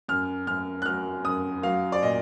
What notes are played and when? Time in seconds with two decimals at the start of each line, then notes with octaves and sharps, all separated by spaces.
0.08 F#2 F6
0.47 F#2 F6
0.82 F#6
0.86 F#3 F6
1.24 F#2 D#6
1.63 F#3 F5
1.92 D5
2.02 A#2 D#5